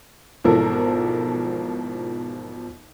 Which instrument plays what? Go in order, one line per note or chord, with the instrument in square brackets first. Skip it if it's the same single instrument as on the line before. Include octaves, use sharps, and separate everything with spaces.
[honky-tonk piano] G#1 B2 E3 F3 A4 A#4